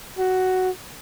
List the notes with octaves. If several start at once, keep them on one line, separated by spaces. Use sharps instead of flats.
F#4